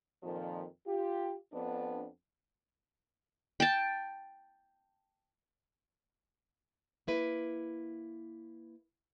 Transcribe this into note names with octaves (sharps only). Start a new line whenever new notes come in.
F2 A#2 D#3 F3
F4 G4
F2 B3 D4
G5 A5
A#3 E4 B4